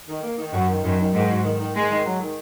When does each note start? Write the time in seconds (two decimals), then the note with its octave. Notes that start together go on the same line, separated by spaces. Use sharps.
0.08 D#3
0.23 A#3
0.38 D#3
0.53 F#2 F#4
0.68 D#3
0.83 F#2 D#3
0.98 D#3
1.13 G#2 D#3
1.28 F#4
1.44 D#3
1.58 D#3
1.74 D#3 G#3
1.89 D#3
2.04 F#3
2.19 D#3